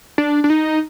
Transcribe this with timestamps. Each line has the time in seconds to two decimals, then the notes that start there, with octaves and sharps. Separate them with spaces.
0.18 D4
0.44 D4
0.50 D#4